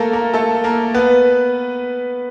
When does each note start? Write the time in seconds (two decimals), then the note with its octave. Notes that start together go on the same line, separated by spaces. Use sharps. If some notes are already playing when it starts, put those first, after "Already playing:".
Already playing: A3 A#3 A4 A#4
0.13 A#3 A#4
0.34 A3 A4
0.64 A#3 A#4
0.94 B3 B4